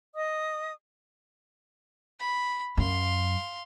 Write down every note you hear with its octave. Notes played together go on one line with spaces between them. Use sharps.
D#5 D#6
B5
F#2 F5 C6